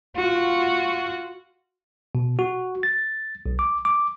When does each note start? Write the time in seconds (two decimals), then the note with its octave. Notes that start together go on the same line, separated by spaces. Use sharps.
0.14 F4 F#4
2.15 B2
2.39 F#4
2.83 A6
3.46 B1
3.59 D6
3.85 D6